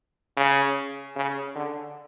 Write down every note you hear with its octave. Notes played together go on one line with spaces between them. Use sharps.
C#3
C#3
D3